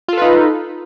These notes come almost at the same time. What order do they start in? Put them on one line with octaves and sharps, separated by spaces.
F4 A4 B4 D#4